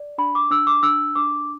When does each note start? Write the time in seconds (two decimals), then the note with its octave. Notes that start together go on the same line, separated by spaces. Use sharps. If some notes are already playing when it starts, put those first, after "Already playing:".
Already playing: D5
0.18 D4 B5
0.35 D6
0.51 D4 E6
0.67 D6
0.83 D4 E6
1.15 D4 D6